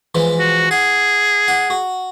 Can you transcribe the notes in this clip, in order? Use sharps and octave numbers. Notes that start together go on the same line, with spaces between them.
E3 F3 G#3
F#4
G#4 F#5
F#5
F#4